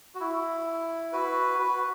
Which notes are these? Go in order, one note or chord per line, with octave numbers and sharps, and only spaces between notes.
F#4
E4
F#4 B4
F#4 B4